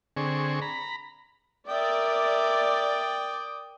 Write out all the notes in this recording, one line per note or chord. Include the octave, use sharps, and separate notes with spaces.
D3 C4 G#4 C#6
A#5 B5
A#4 D5 E5 G5 D#6